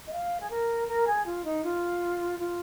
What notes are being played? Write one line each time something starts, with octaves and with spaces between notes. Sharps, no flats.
D#5
F5
G#4
A#4
A#4
G#4
F4
D#4
F4
F4